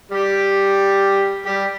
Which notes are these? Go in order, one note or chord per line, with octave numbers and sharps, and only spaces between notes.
G3 G4
G3 G4